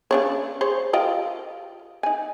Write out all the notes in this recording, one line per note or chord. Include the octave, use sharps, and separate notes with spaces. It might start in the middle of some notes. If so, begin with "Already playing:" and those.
C#3 D4 C#5
G#4 C5 C#5
F4 G4 D#5
D#4 G#5